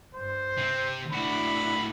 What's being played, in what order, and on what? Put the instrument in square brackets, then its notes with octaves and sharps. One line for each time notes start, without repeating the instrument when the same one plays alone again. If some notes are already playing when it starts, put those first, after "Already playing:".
[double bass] G2 [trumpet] C5
[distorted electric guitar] C3 C4
[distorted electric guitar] A2 F#4 [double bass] D4 E4 [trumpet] B5